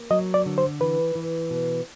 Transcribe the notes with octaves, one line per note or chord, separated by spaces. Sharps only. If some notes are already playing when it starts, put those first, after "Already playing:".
Already playing: A#3
F#3 D#5
D5
D3
C5
E3 B4
E3
B2